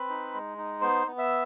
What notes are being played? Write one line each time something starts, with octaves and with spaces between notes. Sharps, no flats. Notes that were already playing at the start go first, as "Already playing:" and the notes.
Already playing: C4 B4 B5
D#4
G#3
D#4
B3 C5 C6
B3
E5 E6